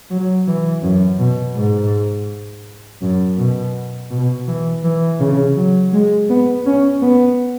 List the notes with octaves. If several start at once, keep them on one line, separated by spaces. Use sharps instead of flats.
F#3
E3
F#2
B2
G#2
F#2
B2
B2
E3
E3
C#3
F#3
G#3
B3
C#4
B3